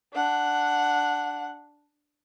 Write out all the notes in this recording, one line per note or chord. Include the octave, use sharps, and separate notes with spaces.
D4 F#5